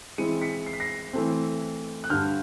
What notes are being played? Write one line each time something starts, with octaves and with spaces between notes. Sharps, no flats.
E3 G#3 C4 E4 C#7 D#7
B6 C#7
C7
B6
A#6 C7
E3 A3 C4
F#6
G2 D3 G3 F6 G6